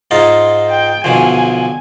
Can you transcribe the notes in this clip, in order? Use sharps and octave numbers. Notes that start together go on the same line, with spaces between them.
G#2 D#4 F4
G5
B1 D3 F3 G#5